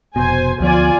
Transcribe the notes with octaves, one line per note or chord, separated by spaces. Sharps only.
F1 B2 C5 G#5
D2 F3 B3 F4 D5 G#5